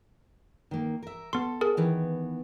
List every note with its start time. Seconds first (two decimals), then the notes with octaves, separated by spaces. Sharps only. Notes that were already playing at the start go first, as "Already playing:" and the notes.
0.71 D#3 A#3
1.03 A#4 E5
1.33 B3 A4 C6
1.61 G#4 A#4
1.77 D#3 E3 B3